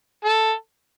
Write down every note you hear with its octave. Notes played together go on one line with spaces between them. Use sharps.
A4